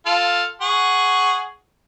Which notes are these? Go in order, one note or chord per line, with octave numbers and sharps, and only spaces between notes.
F4 A4 F5
G#4 F#5 C#6